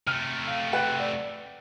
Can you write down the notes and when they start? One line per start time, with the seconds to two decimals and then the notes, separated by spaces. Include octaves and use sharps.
0.07 C3 A3 F6
0.47 F5
0.73 B4 F#5 G5
1.00 D5